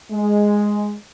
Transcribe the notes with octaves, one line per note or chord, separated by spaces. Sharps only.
G#3